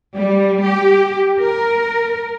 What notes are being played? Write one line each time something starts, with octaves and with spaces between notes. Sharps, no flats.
G3
G4
A#4